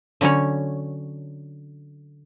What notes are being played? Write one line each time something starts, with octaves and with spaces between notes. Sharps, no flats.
D3 F#3 C#4 C#5